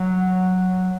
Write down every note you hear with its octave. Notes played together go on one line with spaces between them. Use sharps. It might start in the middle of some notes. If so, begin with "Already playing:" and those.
Already playing: F#3